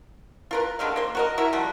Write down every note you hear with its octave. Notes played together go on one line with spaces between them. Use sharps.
F4 A#4 B4
D3 D#3 G#3 F5
A#3 C5
F#4 A#4 D#5
E4 F#4 A#4 E5
F3 G3 F#4